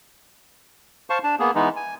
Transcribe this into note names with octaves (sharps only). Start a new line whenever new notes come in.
C5 F5 A5 C#6
D4 A5
A#3 B3 G#4
E3 G#3 B3 D#4
G#5